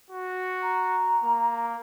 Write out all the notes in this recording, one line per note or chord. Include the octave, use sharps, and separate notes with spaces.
F#4
A#5
A#3